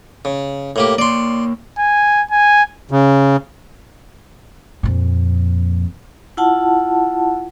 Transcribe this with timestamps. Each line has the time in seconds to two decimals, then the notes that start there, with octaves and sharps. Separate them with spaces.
0.25 C#3
0.76 A2 A#3 G4
0.98 A#3 C#5 D5 C6
1.79 G#5
2.31 G#5
2.91 C#3
4.83 F2 A#2
6.37 E4 F4 F#5 A5